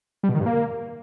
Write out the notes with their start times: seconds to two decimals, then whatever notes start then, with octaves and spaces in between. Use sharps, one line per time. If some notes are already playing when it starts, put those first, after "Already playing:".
0.23 G3
0.29 B2
0.35 D#3
0.40 G2
0.46 A#3